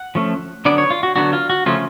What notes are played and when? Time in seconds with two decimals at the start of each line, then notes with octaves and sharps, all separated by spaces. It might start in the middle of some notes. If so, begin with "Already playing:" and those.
Already playing: F#5
0.15 F3 A3 C#4
0.65 D3 F#3 B3 D4 D5
0.78 C#5
0.91 F4
1.03 F#4
1.16 D3 F#3 B3 D4 F#4
1.33 F4
1.50 F#4
1.66 C#3 F3 A3 C#4 F4